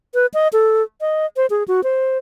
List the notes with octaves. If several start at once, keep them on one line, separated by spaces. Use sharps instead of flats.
B4
D#5
A4
D#5
C5
G#4
F#4
C5